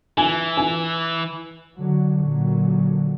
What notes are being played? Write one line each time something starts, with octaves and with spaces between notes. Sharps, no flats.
E3 G#5
G#5
D3 F#3
A#2 F#3